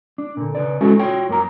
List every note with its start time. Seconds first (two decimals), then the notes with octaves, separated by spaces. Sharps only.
0.18 D4
0.37 A#2 D3
0.55 C#3 B4 D5
0.81 G#3 C#4 E4 F#4 A4
0.99 F4 F#4 C#5 G5
1.29 F#2 A#3 A#5